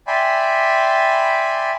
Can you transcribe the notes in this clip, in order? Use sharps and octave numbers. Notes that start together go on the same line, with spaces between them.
D5 E5 G5 G#5 B5 C6